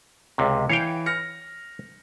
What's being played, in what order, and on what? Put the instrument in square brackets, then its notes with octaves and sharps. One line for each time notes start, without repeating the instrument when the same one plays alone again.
[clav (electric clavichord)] C#2 C3
[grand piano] E3 [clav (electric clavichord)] C#5 F5 G5
[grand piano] F6 A#6 C#7